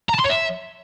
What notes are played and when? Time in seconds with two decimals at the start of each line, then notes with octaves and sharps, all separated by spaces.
0.10 A#5
0.15 A5
0.20 C6
0.25 C#5
0.30 E5